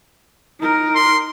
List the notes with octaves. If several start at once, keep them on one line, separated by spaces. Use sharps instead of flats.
D#4 A#4
C6